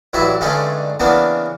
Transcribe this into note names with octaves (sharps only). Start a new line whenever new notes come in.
A1 G2 F#3 E4 E5
G2 D3 G#3 A3 C#4 D#4
C#3 E3 A#3 B3 D4